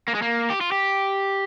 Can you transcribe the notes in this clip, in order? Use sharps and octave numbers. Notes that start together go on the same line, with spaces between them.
A#3
G#3
A#3
G4
F4
G4